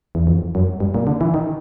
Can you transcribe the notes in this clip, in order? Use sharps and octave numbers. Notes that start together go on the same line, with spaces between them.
E2
F2
F#2
G2
A#2
D3
E3
D#3